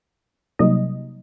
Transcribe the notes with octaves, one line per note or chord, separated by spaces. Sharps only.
C3 F#3 G3 A#3 D#4 D#5